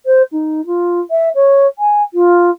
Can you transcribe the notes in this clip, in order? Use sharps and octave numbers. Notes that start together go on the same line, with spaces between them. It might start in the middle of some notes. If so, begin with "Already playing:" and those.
C5
D#4
F4
E5
C#5
G#5
F4